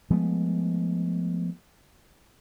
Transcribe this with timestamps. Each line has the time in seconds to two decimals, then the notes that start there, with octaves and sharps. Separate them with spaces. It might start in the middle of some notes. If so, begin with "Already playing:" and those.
0.10 F3 G#3 A3 B3